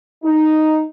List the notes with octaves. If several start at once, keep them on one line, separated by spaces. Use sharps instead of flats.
D#4